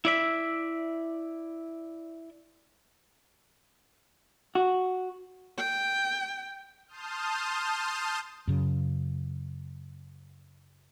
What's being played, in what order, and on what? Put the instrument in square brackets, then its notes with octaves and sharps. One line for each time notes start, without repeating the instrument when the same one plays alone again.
[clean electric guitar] E4 D5 E5
[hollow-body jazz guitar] F#4
[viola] G5
[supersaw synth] A5 C6 D#6 F6 G6
[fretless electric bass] F#2 C#3